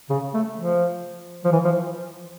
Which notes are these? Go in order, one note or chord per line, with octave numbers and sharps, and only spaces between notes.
C#3
A3
F3
F3
E3
F3